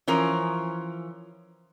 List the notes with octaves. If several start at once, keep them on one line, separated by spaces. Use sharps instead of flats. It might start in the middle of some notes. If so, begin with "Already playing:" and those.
E3 F3 C#4 A#4